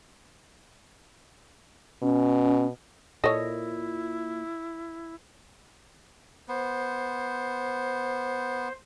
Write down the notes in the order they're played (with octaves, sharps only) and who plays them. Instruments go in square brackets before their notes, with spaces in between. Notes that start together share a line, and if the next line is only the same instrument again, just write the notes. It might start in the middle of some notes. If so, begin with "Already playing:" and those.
[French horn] B2 [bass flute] C#4
[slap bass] A#2 [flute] E4 [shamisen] A4 C#5 [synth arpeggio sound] D#5 D#6 A#6
[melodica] B3 [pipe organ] C5